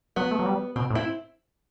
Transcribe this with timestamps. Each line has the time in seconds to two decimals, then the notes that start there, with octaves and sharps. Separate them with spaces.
0.16 F#3 B3
0.31 A3
0.39 F#3
0.46 G3
0.76 B2 C4
0.90 A2
0.95 C4 E4